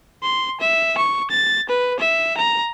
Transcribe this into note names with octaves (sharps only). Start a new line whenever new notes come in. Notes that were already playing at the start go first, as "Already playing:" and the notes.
C6
E5
C#6
A6
B4
E5
A#5